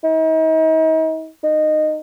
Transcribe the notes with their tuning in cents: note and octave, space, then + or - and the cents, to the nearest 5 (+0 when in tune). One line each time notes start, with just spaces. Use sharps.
D#4 +40
D#4 -15